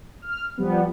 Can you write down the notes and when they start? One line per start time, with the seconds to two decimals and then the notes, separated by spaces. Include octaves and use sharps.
0.22 F6
0.58 F3 G3 B3